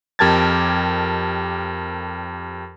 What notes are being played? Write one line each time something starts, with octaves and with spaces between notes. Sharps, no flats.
F2 G4 A#4 A5 G#6 A6